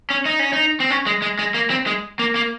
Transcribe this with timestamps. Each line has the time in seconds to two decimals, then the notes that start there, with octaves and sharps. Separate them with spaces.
0.10 C#4
0.26 D#4
0.39 C#4
0.53 D#4
0.80 C4
0.90 C#4
1.06 G#3
1.22 G#3
1.39 G#3
1.54 A#3
1.70 C4
1.87 G#3
2.19 A#3
2.35 A#3